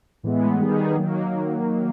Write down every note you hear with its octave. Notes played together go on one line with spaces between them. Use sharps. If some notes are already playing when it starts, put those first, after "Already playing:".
A2 E3 G#3 B3
D#3 G3 B3 D#4 G#4
D#3 F#3 A#3